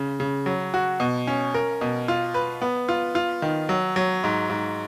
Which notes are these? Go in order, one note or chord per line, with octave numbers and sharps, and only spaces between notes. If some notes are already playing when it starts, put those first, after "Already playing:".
Already playing: C#3
C#3
F#3
F#4
B2
C#4
A#4
B2
F4
B4
B3
F4
F4
D#3
F#3
F#3
G#2
G#2